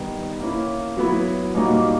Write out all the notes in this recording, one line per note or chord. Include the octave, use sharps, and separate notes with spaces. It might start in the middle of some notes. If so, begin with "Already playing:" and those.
Already playing: D#3 G3 B3
A#3 C#4 E4
F#3 B3 E4
A#2 G3 A#3 D#4 F#4